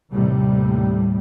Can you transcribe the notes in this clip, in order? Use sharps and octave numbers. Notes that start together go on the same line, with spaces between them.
D#2 A2 C3 G3